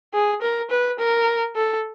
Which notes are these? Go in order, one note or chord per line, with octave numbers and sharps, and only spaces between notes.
G#4
A#4
B4
A#4
A4